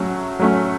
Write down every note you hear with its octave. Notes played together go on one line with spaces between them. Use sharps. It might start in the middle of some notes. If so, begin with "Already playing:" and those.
Already playing: F#3 A3 C#4
F#3 A3 C#4